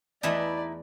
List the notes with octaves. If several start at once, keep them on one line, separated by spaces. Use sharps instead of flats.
E2 E3 A3 D#4 E4 B4 D5